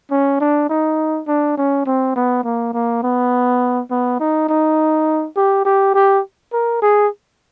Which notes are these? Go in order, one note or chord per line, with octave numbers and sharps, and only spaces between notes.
C#4
D4
D#4
D4
C#4
C4
B3
A#3
A#3
B3
B3
D#4
D#4
G4
G4
G4
A#4
G#4